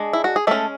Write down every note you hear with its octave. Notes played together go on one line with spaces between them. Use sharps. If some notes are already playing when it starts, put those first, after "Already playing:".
Already playing: G#3 D4 G#4
E4
F#4
G#4
G#3 A3 C#4 A4